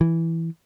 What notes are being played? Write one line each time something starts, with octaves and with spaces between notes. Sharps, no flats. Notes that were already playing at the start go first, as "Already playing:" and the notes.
E3